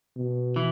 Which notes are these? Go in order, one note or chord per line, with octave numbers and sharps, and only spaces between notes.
B2
E3